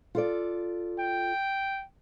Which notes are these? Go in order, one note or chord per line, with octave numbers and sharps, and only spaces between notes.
F4 A4 D5
G5